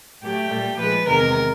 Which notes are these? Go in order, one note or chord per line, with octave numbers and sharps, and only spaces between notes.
A2 F#3 A3 G4
A#2 G3
A#2 F3 G#3 B4
E2 C3 D#3 G#3 A#4